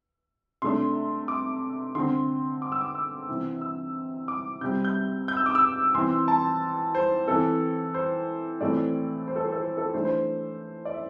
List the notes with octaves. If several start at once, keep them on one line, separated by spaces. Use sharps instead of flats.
C3 A3 D4 C6
D6
D3 C4 C6
D6
E6
D6
E6
C3 E3 C4
E6
D6
C3 G3 C4 G6
G6
G6
E6
D6
E6
E3 C4 C6
A5
C5
E3 C4 A4
C5
A2 E3 A3 C4 D5
C5
A4
C5
A4
C5
A4
E3 A3 D4 C5
C5
D5
E5